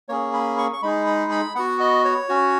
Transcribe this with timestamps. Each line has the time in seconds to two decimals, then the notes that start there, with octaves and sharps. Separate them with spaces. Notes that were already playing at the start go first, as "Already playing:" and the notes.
0.09 A#3 C#4 G#4 C#5
0.34 B5
0.58 C#6
0.73 C#6
0.82 G#3 D#4 G#4 B5
1.07 B5
1.31 B5
1.55 B3 F#4 F#5
1.80 D#5
2.04 C#5
2.29 C#4 F#4